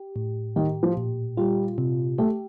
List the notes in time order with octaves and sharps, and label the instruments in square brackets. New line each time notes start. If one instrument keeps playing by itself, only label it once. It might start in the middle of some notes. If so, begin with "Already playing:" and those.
Already playing: [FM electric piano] G4
A2
[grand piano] D#3 [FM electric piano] G4
[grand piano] F3
[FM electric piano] A#2
[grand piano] G3 [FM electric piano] F4
[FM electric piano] C3
[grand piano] A3 [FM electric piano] G4